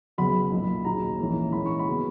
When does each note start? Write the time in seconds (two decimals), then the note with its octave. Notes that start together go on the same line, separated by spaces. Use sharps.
0.18 F#1 F#2 C#3 F#3 B3 B5
0.51 B1 A#2 A#3
0.85 D#2 C#3 F#3 A#5
1.19 A#1 G#2 E3 A#3 C#4
1.52 G#2 E3 A#3 C#4 B5
1.66 C#6
1.79 B5
1.88 C#3 F#3 B3